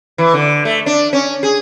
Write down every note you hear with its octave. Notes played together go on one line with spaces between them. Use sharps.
E3
D3
A3
D4
C#4
G#4